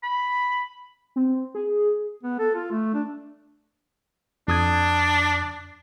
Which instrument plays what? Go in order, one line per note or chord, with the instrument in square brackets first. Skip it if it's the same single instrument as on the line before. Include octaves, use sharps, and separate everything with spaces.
[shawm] B5
[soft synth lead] C4
G#4
[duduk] B3
A4
F4
A3
D4
[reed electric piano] F2 D#6 G#6 [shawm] D4